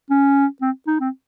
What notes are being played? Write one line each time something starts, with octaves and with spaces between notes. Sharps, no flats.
C#4
C4
D#4
C4